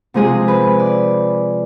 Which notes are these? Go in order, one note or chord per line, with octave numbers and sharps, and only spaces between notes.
C3 F3 G#3 G#4
B4
D5